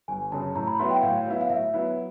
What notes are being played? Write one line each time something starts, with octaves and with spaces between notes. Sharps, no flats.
G1 G#5
F#2 C#3 A5
A2 A#5
B5
F#3 B3 E4 C6
G5
A2 F5
F#3 B3 E4
F5
A2 E5
F#3 B3 E4